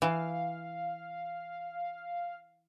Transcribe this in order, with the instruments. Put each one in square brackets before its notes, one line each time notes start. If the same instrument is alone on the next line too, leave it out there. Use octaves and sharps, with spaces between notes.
[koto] E3 [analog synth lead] F5